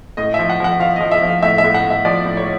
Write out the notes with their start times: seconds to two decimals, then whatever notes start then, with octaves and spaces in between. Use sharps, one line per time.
0.17 A2 D#5
0.34 F3 E5
0.49 F#5
0.60 F3 F#5
0.80 F3 F5
0.96 F3 D#5
1.11 E5
1.22 F3
1.27 F5
1.42 A2 E5
1.58 E5
1.64 A2
1.74 F#5
1.85 A2
1.90 E5
2.05 F3 D5
2.26 A2
2.37 C#5